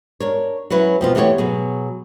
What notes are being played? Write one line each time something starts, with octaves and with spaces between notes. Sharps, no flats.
D4 A#4 C#5
F#3 C#4 E4 B4
F2 B2 F4
E3 A3 B3 G4 A4 C#5
B2 F#3 G#4